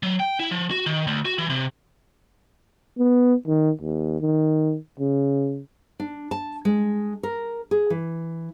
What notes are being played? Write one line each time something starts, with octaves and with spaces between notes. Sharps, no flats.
F#3
G5
E4
F3
F#4
D#3
D2
F#4
E3
C3
B3
D#3
D#2
D#3
C#3
D4
A5
G#3
A#4
G#4
E3